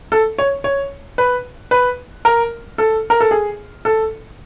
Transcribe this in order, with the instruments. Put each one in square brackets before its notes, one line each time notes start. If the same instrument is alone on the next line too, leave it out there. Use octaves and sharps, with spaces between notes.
[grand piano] A4
C#5
C#5
B4
B4
A#4
A4
A#4
A4
G#4
A4